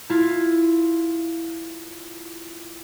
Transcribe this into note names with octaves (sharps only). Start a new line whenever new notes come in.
E4 F4